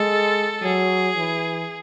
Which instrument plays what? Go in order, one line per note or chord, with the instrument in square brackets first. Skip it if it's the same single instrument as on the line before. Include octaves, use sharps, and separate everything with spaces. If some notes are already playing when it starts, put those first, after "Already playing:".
Already playing: [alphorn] G#3 [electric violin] A4
[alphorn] F#3 [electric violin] G#4
[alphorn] E3